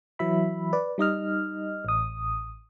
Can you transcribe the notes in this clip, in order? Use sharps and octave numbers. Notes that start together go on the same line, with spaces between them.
E3 F#3 E5 B5
B4 D5
G3 D#4 D#5 F6
A1 D#6